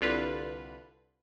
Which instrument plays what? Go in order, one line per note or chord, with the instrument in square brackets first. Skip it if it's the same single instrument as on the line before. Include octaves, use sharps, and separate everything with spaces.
[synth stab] C2 D3 F4 B4